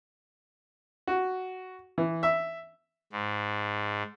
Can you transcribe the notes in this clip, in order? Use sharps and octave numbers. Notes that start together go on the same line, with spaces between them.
F#4
E3
E5
G#2